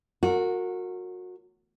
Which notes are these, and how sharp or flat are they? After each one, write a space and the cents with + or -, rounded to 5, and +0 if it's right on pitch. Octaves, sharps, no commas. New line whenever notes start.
F#4 -25 A#4 -30 C#5 +0